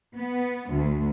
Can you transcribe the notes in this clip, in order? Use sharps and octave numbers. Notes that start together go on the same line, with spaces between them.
B3
D2